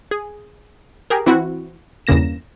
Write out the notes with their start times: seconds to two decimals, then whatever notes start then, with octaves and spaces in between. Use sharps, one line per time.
0.11 G#4
1.10 G4 G#4 A#4
1.26 E3 C4 E4 F#4
2.07 E2 G2 C#3 A#3 A#6 E7